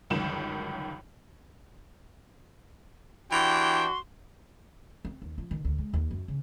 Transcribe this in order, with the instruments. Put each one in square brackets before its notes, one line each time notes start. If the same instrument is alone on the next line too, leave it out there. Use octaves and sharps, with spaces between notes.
[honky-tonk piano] G1 C#2 F#2 D#3 E7
[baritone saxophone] E3 [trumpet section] D4 G4 G5 [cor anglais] F#4 [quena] C6
[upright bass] C4
D#2
F3
D#3
D2
G#3
D#2
F#2
C#3